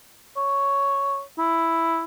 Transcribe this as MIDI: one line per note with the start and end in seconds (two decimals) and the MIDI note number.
0.37 1.21 73
1.38 2.05 64